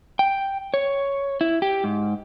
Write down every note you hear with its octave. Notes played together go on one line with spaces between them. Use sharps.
G5
C#5
E4
G4
G#2